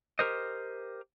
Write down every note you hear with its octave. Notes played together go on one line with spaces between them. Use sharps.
G4 A#4 C5 D#5